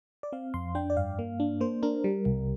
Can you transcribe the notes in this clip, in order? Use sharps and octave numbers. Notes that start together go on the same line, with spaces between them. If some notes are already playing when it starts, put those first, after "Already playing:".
D5
C4 F5
F2 C6
D4 G5
D5
G2 F5
A#3
D4
A#3 C5
D4 A#4
G3
C2